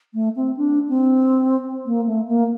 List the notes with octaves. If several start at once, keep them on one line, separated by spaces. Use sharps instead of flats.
A3
C4
D4
C4
A#3
A3
A#3